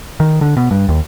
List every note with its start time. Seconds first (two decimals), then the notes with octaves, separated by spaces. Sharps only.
0.20 D#3
0.41 D3
0.57 B2
0.71 G2
0.89 D#2